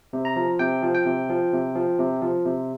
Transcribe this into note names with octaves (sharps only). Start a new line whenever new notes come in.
C3
A#5
F3
C3 G5
F3
G5
C3
F3
C3
F3
C3
F3
C3